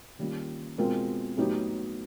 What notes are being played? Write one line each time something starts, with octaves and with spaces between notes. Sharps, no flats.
D#3 G3 A#3 C#4 F4
B2 G#3 C4 F4 A#4
A2 F#3 B3 D#4 G4